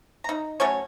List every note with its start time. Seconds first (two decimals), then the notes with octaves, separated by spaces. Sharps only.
0.24 D#4 A#5
0.60 F#3 A3 C#4 C#5